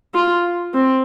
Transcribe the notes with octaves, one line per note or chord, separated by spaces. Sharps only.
F4
C4